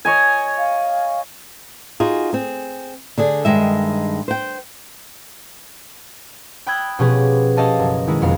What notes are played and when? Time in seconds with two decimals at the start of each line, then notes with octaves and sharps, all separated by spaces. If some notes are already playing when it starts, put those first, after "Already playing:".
0.05 C#5 D#5 G#5
0.58 F5
2.00 D#4 F4 F#4 G#4
2.33 C4 G#4
3.18 D3 D4 G#4
3.45 G2 D#3 G#3 E5
4.28 C5 G5
6.67 G5 B5 D#6 E6 F#6 G#6
6.99 B2 F3 C#4 G4 G#4 B4
7.57 C#4 G4 A4 D#5 F5 A5
7.79 F#1 F#3 A#4
8.08 D#3 G#3 E4
8.21 F1 F2 B3 F5